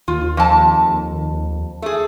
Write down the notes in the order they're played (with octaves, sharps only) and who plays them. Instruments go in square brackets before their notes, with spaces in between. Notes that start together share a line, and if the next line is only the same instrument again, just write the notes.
[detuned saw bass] D#2 [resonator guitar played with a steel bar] F4
[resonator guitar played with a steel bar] F2 A5
A3 G#4